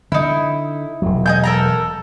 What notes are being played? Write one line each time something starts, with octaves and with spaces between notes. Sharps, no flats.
D3 D#4 E4
E1 F#3
D#5 G#5 G6
A4 A#4 A#5